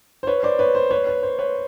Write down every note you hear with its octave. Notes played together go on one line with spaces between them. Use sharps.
C5
B4 C#5
C5 D5
B4 C#5
C5
B4 C#5
B4
C5
B4 C#5